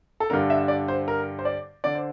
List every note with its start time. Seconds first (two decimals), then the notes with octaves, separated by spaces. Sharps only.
0.20 A4
0.30 G2 D3 A#4
0.50 E5
0.68 D5
0.88 C5
1.08 A#4
1.39 C5
1.45 D5
1.84 D3 D5
1.95 C5